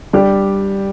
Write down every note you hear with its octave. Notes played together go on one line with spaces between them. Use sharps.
G3 D4 G4 D5